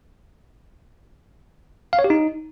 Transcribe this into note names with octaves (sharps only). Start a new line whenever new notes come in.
F5
C#5
G4
D#4